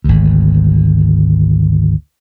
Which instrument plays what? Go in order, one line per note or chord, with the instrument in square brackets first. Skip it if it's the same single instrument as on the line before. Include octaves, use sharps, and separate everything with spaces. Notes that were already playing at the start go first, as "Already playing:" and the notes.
[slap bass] G#1 D2